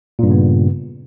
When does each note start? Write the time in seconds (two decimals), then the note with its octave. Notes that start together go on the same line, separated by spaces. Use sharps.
0.19 A#2
0.23 G2
0.27 C#3
0.31 B3